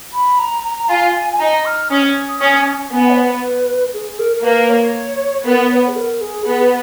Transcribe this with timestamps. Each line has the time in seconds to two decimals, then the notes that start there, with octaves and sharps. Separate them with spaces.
0.13 B5
0.39 A#5
0.64 A#5
0.83 A#5
0.89 F4 G#5
1.15 G#5
1.33 G#5
1.40 D#4 A#5
1.65 F6
1.91 C#4 D#6
2.41 C#4
2.92 B3 G#5
3.10 C#5
3.17 B4
3.93 G#4
4.19 A#4
4.36 A#4
4.44 A#3 B4
4.69 C#5
5.45 B3 A#4
5.71 C#5
5.88 G#4
5.96 A#4
6.21 G#4
6.46 B3 G#4
6.62 B4